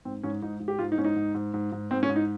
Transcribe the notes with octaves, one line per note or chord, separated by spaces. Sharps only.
G#2 C4
G#2 C#4
G#2 D#4
G#2
G4
G#2 F4
D#4
G#2 C#4
D#4
G#2
G#2
G#2
G#2
G#2 C4
C#4
G#2
D#4